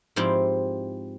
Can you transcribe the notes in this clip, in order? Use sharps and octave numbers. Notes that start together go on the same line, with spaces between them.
G#2 F3 C4 E4 G4